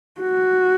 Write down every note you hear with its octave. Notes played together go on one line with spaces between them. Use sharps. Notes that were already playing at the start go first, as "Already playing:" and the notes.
F#4